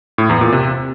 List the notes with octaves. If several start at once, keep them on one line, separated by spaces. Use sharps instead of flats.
A2
E2
A#2
C3